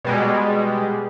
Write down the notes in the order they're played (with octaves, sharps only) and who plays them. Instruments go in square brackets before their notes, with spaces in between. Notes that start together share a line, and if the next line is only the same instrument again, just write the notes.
[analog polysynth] B2 G3 G#3